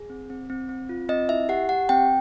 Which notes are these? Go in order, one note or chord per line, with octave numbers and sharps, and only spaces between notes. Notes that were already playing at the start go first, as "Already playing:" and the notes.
Already playing: G#4
C4
C4
C4
C4
F4
C4 D#5
E4 E5
G4 F#5
G4 F#5
C4 G5